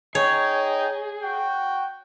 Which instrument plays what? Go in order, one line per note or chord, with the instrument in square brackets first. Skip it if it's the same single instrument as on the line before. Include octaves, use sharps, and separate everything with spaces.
[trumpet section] D#4 D#5 G5 [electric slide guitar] G#4 [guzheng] C#5
[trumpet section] F#4 G5